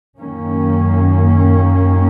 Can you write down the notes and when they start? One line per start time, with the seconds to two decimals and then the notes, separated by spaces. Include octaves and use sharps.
0.18 F#2 D#3 A#3 C#4